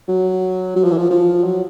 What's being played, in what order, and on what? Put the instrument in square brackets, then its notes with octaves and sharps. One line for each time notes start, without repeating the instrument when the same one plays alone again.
[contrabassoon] F#3
F#3
F3
E3
F3
F3
F#3